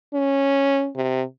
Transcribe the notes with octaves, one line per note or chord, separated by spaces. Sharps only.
C#4
C3